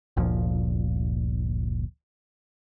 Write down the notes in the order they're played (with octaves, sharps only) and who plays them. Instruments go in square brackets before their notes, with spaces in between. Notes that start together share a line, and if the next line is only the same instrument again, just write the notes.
[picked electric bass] G1 D2 A#2 F3